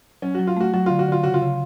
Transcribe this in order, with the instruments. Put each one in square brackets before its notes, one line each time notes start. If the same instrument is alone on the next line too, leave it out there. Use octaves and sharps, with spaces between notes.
[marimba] F#3 [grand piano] C#4
[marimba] F#3 [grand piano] F#4
[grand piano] F4
[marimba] A3 [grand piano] F#4
[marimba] F#3 [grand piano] F#4
[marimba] D3 [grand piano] F4
[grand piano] F#4
[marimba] D3 [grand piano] F4
[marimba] C#3 [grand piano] F#4
[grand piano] F4
[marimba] C#3